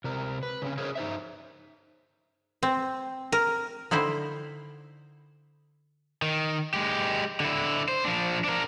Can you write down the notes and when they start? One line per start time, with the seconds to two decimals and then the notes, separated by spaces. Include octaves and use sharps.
0.04 C3 A#4
0.43 B4
0.62 C#3 C4 C#4
0.78 G#4 A#4 C5 C#5
0.95 D#4 C5 E5
2.63 C4
3.32 A#4
3.91 D3 D#4 E4 C5 G5
6.22 D#3
6.74 G#3 G4
7.40 D3 E4
7.88 C5
8.05 F3 D4
8.44 D4 A#4